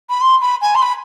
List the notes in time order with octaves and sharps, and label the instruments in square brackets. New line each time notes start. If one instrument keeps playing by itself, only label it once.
[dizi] B5
C6
B5
G#5
C6
B5